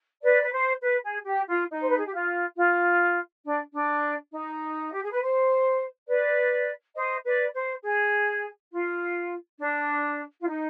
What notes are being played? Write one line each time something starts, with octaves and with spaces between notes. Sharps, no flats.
B4 D5
B4
C5
B4
G#4
G4
F4
D#4
C5
B4
G#4
G4
F4
F4
D4
D4
D#4
G4
G#4
B4
C5
B4 D5
C5 D#5
B4 D5
C5
G#4
F4
D4
F4
D#4